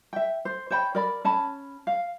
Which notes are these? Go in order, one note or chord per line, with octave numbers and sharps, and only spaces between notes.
E5 G5
C5
C5 C#5 G5 B5
A#4 D5 B5
C#4 A5 B5
F5